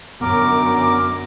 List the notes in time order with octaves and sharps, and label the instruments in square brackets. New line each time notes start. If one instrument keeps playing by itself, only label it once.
[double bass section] F#2 D3 [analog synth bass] B3 [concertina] A#4 [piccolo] D6